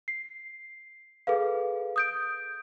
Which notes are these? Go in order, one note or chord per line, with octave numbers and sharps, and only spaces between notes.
C7
G#4 A4 B4 F5
D#6 G6 D7